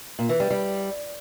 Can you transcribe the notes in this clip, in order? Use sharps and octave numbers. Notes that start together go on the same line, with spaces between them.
A#2
E3
G3
G3